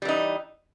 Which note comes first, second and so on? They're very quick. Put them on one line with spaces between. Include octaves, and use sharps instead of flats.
G3 E3 D#4